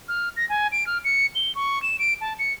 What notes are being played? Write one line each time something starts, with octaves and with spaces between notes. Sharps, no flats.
F6
A#6
G#5
D7
F6
C#7
G7
C#6
E7
D7
A5
C#7